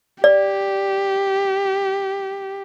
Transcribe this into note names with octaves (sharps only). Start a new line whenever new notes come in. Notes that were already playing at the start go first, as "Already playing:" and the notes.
G4 D5